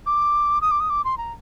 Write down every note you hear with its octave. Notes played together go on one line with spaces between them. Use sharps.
D6
D#6
D6
D#6
D6
C6
A#5